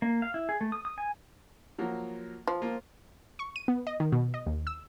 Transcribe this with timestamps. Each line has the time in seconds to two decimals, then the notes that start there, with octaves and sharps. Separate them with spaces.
0.02 A#3
0.22 F5
0.34 E4
0.49 G#4
0.61 A3
0.72 D#6
0.85 D#6
0.98 G#5
1.78 F3 F#3 A#3
2.47 F3
2.62 A#3 F4
3.39 C#6
3.56 D#7
3.68 B3
3.87 D#5
4.00 D#3
4.12 B2
4.34 D#5
4.46 D#2
4.67 E6